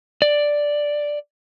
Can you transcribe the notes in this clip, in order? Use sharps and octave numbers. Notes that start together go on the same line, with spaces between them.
D5